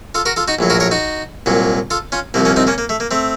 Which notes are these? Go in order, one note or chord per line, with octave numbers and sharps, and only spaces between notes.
F4 A4
F#4 A#4
F4 A4
D#4 F#4
A#1 A2 F#3
F#4 A#4
A#4 C#5
D#4 F#4
C2 A#2 F#3
F4 A4
C#4 F4
C2 C3 F3 A#3
A#3 C#4
C4 D#4
A#3 C#4
A#3
A3
A#3
A3 C4